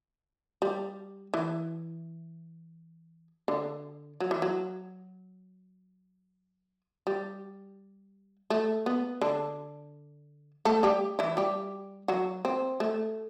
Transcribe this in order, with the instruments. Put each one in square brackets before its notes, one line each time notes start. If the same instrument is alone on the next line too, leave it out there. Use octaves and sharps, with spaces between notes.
[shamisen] G3
E3
D3
F#3
E3
F#3
G3
A3
B3
D3 D4
A3 A4
G3 G4
E3 E4
G3 G4
F#3 F#4
C4
A3